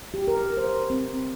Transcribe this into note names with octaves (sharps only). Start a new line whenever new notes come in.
G4
A#4
C5
C4